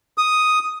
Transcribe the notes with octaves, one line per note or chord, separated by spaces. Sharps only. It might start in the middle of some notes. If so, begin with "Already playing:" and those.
D#6